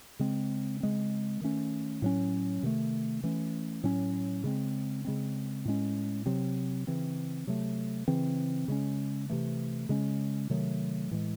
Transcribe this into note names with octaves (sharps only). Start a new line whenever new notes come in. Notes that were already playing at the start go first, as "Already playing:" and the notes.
C#3 G#3 C4
C#3 G#3 C4
D#3 A3 C#4
A2 F#3 C#4
C3 D#3 A3
E3 A3 C#4
A2 F#3 C#4
C#3 G#3 C4
C#3 G#3 C4
A2 G#3 C#4
C3 F#3 C4
C#3 E3 C4
C3 F#3 A3
C#3 E3 C4
C#3 G#3 C#4
C3 E3 A3
C#3 G#3 C#4
C3 D#3 F#3 A3
A2 E3 G#3